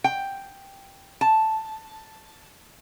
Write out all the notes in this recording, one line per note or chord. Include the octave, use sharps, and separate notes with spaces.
G5
A5